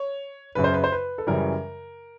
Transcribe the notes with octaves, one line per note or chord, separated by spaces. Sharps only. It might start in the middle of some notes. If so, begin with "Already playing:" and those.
Already playing: C#5
F#2 C#3 F#3 B4
C5
B4
C5
B4
A4
F#2 C#3 E3 G3 A#4